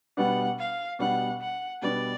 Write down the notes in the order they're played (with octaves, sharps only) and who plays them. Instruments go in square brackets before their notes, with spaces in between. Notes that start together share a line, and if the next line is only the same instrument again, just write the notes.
[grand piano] B2 G3 B3 D4 [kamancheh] F#5
[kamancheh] F5
[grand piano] B2 G3 B3 D4 [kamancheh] F#5
[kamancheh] F#5
[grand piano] B2 G3 B3 D4 [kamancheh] D5